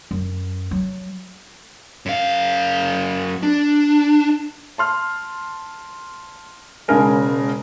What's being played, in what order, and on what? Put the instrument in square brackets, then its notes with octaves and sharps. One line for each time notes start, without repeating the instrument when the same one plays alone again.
[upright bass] F#2
F#3
[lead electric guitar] F#2 F5
D4
[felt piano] A5 C6 F6
E1 C#3 G#3 A#4 G#5